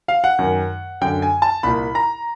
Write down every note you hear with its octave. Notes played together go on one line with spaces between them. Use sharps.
F5
F#5
F#2 D#3
F#2 D3 G5
G#5
A5
C2 A#2 B5
A#5